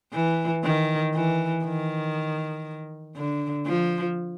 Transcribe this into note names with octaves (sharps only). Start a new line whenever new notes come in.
E3
D#3
E3
D#3
D3
F3